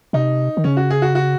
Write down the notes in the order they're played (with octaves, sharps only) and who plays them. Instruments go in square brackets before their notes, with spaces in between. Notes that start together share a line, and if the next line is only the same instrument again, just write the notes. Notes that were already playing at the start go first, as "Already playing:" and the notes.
[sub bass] C3 [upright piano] D#4
[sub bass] D#3
[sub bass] C#3 [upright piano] C#4
[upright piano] F#4
G#4
F#4
F#4